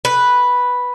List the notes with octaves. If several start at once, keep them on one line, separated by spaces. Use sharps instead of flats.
B4